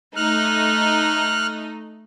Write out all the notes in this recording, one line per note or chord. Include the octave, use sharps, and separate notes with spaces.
A3 D#4 F6 F#6